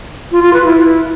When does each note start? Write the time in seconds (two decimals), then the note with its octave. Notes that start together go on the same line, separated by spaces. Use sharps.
0.32 F4
0.42 F4
0.53 B4
0.64 E4